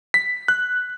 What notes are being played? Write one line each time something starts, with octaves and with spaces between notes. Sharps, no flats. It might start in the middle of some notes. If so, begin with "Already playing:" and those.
B6
F#6